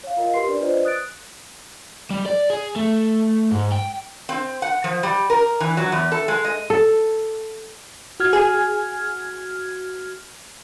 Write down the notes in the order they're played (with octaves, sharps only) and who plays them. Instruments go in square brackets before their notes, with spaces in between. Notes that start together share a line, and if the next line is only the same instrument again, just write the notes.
[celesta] C#5 F5
F4 A#4 D#5 F5
G4 A#4 B4 C6 C7
D4 B4 D5
D4 F4 B4 C5 D5 D#5
D#6 F#6 A6 D7
[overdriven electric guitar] G3
D5
G#4
A3
G#2
G5
[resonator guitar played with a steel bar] C4
F#5
F3
G3
A#4
E3
F#3
E2
A4
G#3
D#5
[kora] A4
[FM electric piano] F#4 F6 G#6
[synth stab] G#4